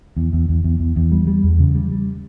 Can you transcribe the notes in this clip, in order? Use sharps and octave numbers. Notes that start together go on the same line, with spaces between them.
E2
E2
E2
E2
E2
E2
G3
G3
E2
C#3
G3
G3